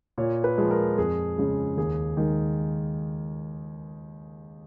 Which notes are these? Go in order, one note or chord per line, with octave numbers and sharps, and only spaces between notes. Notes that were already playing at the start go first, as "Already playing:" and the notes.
A#2 C#5
B4
F3 G#3
A#4
F2 G#4
C#3 G#3
D#2 G#4
D#3 G#3